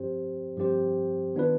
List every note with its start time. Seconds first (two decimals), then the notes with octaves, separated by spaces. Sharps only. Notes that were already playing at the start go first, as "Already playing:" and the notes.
Already playing: G2 F3 C4 G4 C5
0.57 G2 F3 C4 G4 C5
1.35 D#3 B3 D4 F4 B4